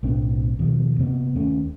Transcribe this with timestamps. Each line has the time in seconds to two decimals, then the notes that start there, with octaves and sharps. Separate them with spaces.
0.03 B1 A2 C4 D4
0.59 D#2 B2 F3
0.99 C3 A#3 B3
1.35 D#2 A3 C#4